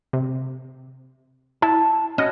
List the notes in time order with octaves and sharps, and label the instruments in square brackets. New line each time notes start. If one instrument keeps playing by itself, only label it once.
[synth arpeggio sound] C3
[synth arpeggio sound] E4 [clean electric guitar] A5
[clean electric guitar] C#4 E4 F#4 [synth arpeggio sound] D#5